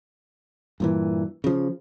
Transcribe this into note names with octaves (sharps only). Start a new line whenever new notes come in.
G2 A#2 E3
C#3 F3